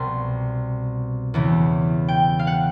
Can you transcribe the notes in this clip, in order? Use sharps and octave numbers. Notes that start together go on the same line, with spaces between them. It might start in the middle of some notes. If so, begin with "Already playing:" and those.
Already playing: C2 B2 C6
E2 C#3 E3
G5
F5
F#5